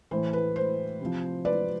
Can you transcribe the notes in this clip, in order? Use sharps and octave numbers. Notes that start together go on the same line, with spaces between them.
A2 E3 C5
B4
C5
C3 F3
B4 D5